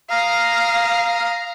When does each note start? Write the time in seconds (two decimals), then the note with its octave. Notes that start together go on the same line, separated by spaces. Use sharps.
0.10 F5 A#5 D#6 F6